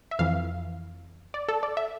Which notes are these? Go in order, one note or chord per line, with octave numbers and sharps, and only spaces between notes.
E5
F2 E3 F5
D5
A4
D5
E5